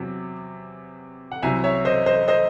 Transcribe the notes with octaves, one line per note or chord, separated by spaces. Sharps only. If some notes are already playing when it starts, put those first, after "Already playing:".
Already playing: E2 C3 F#3
F#5
C2 C3 F#3 E5 G#5
C#5 E5
C5 D#5
C5 D#5
C5 D#5